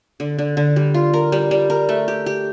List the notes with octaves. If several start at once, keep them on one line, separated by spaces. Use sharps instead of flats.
D3
D3
D3
G3
F4
A#4
G3
G3
A#4
A3
G4
G4